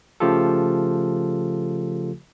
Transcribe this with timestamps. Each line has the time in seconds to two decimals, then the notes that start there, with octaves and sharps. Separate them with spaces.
0.20 C#3 F3 A3 F4 G4 A4